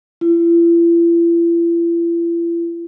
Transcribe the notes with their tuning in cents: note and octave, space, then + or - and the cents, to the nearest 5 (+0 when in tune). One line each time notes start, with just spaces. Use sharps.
E4 +45